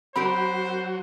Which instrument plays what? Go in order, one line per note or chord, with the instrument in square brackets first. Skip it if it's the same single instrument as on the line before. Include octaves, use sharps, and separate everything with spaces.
[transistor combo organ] F#3 [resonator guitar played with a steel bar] C4 G4 A#4 [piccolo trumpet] C5 [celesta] B5